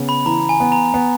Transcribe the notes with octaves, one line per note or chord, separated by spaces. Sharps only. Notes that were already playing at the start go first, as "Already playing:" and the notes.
Already playing: C#3 B3
B5
E3 A#5
G#5
B3
A#5
B3